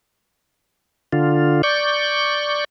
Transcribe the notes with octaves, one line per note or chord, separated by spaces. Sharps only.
D3 F4
D5 C#6 G6